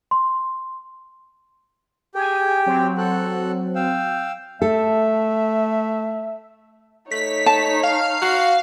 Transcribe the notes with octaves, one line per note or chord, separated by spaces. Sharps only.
C6
G4 G#4 G5 G#5
F#3 C4
F#4 A4 F#6
F5 G5 E6
A3 A4 E5
A3 D#4 C#5 B6
A5
F5
F#4